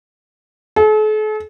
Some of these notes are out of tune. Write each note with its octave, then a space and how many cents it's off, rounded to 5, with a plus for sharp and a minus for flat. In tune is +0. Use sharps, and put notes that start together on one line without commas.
A4 -45